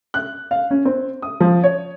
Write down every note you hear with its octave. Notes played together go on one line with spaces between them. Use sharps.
F#6
F5
C#4
C4
D#6
F3
C#5